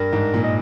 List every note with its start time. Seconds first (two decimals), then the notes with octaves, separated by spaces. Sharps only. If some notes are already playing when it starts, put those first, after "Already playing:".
Already playing: G2 A#4
0.13 G#2
0.34 A#2
0.44 D#5